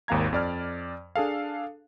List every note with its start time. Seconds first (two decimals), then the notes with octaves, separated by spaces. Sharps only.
0.08 G#1 D#2 A#3 F5 A#5 G#6
0.33 F2 D5 F6
1.16 D4 G#4 A4 F5